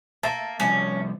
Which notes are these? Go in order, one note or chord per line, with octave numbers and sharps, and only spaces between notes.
A#3 E5 A5
C3 F3 G3 C#4